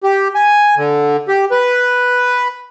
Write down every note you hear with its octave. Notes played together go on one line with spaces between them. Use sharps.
G4
G#5
D3
G4
B4